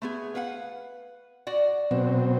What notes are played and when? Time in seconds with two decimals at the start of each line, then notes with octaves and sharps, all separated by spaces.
0.02 A3 B3 G#4
0.35 B4 F5 F#5
1.47 F#4 D5 F#5
1.91 B2 F#3 C4 F#4